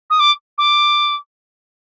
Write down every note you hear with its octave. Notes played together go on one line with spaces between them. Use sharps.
D#6
D6
D6